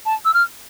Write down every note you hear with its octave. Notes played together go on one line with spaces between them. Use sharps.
A5
E6
F6